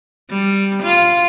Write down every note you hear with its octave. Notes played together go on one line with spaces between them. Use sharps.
G3
F4